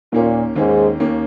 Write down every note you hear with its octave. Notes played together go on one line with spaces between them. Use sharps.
D#2 A#2 D#3 A#3 C#4
D#2 G#2 D#3 A#3 C#4
D#2 D#3 A#3 C#4